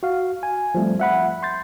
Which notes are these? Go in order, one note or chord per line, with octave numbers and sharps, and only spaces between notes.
F#4 F5
G#5
F3 G3 A3 C4
E5 F#5 B5
C6 G6 A6